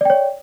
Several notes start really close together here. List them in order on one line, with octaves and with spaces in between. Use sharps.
D5 G5 C#5